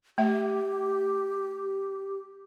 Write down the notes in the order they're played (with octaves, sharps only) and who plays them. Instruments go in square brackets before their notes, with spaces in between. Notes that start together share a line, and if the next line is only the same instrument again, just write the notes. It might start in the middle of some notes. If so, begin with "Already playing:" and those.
[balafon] A3 E5 [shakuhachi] G4